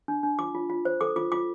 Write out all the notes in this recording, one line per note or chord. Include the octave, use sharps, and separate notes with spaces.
D4
D4
F4 D6
F4
F4
C5
A4 D6
F4 D6
F4 D6